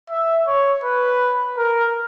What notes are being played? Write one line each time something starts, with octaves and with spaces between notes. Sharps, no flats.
E5
C#5
B4
A#4